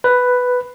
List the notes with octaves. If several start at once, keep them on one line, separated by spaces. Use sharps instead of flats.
B4